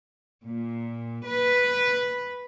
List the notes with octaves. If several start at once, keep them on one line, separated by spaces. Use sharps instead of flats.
A#2
B4